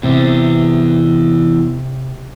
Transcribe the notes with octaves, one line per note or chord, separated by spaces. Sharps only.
E2 C3